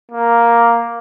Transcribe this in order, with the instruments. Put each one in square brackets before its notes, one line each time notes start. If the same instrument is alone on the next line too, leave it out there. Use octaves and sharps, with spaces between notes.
[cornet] A#3